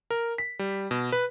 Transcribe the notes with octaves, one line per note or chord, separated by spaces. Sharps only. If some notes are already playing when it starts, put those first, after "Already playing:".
A#4
B6
G3
B2
B4